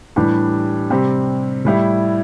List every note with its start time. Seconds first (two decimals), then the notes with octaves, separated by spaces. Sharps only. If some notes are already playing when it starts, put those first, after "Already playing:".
0.16 A2 E3 G3 D4 G4
0.90 C3 G3 C4
1.65 A2 G3 E4